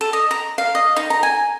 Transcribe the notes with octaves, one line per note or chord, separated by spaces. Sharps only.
A4
D#5
A#5
F5
D#5
D#4
A#5
G#5